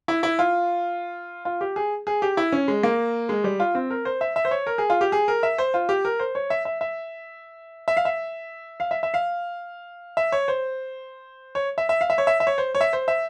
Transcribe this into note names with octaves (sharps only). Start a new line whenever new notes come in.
E4
E4
F4
F4
G4
G#4
G#4
G4
E4
C#4
G#3
A#3
G#3
G3
F4
C4
A#4
C5
E5
E5
C5
C#5
A#4
G#4
F4
G4
G#4
A#4
E5
C5
F4
G4
A#4
C5
C#5
E5
E5
E5
E5
F5
E5
F5
E5
E5
F5
E5
C#5
C5
C#5
E5
E5
F5
E5
C#5
E5
E5
C#5
C5
C#5
E5
C5
E5